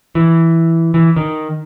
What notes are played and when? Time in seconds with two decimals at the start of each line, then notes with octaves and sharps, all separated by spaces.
0.15 E3
0.94 E3
1.17 D#3